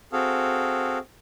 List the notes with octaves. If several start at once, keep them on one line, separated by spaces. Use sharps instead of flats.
C4 F#4 G#4 A4 F5